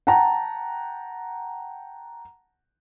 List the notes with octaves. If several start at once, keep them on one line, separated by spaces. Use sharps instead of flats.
F#5 G5 A5 A#5